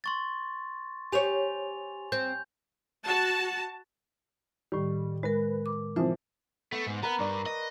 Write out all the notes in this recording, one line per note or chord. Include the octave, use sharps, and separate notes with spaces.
C6 C#6 A6
G4 C5 C#5 G#5 F7
C4 G6
F#4 A5
A2 D#3 G3
G#3 A#4 B4
D6
C3 E3 F3 C5 E5
A3 B3
G#2
B3 A#4 B4 B5
G2 D5 C#6 D6
D#5